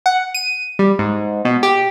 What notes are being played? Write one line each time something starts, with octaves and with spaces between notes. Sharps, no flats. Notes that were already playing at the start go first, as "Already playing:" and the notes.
F#5
D#7
G3
G#2
B2
G4